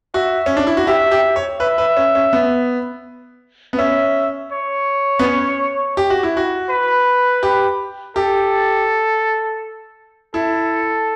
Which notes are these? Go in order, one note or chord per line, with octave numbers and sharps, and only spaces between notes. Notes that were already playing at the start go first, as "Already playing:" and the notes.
F#4 E5
C#4
D4
E4
F#4
G4 E5
G4
C#5
B4 E5
B4
C#4
C#4
B3
B3
C#4 E5
C#5
B3
C#4
G4
F#4
E4
F#4
B4
G4
G4 A4
E4 A4